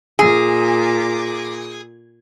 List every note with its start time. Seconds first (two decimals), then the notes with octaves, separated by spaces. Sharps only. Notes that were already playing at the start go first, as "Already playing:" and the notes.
0.19 A#2 G#4 D6